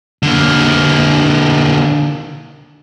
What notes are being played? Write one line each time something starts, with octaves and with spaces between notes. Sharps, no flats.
D3 A#3